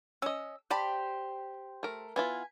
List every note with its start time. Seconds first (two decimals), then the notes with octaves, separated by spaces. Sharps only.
0.22 C#4 D#5 E6
0.71 G4 C5 D5 A5 B5
1.83 A3 A#4
2.16 B3 E4 F4 G#5